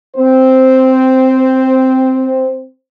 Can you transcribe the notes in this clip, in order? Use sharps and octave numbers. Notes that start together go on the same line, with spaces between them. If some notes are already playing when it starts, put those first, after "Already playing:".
C4 C5